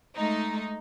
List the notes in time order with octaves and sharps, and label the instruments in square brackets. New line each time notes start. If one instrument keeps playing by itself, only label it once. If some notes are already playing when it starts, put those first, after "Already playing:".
[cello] G#3 A3 [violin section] D#4